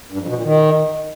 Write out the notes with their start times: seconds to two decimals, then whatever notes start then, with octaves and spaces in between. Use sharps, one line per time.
0.12 G2
0.20 F2
0.28 B2
0.36 A#2
0.44 D#3